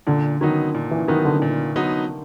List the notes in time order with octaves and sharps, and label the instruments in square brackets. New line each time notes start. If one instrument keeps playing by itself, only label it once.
[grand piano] A#2 [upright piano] D3
[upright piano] D#3 [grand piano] F#3 B3 D#4
[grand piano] A#2
[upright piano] E3
[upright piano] D#3 [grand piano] F#3 B3 D#4
[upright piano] D3
[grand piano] A#2
F#3 B3 D#4